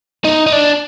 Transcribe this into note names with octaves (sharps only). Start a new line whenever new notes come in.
D#4
D#4
D4